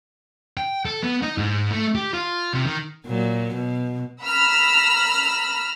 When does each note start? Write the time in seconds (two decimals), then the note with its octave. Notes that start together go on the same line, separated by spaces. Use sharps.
0.57 G5
0.85 A4
1.03 B3
1.22 D#4
1.38 G#2
1.71 A3
1.95 G4
2.13 F4
2.54 C3
2.65 D#3
3.07 A#2 F#3
3.54 B2
4.22 A#5 B5 E6 F6